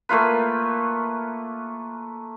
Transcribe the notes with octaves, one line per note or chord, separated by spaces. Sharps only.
A3 A#3 F4 B4